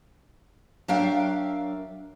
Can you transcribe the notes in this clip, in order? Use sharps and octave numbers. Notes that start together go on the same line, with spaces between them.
F#3 D4 A#4 E5 F5 G5